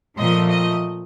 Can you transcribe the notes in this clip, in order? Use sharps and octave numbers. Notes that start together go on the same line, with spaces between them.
A#2 F3 A3 D#5
D#5